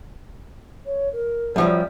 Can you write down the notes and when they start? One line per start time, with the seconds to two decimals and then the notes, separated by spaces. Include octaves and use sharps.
0.86 C#5
1.13 A#4
1.56 F#2 F3 G3 E5